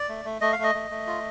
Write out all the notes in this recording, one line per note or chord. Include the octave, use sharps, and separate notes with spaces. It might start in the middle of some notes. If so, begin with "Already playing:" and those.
Already playing: D5
A3
A3
A3 D#5
F5
A3 D#5
A3
A3
F4